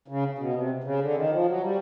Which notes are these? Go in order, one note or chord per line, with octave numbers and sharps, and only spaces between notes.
C#3
B2
C3
C#3
D3
D#3
F3
F#3
G3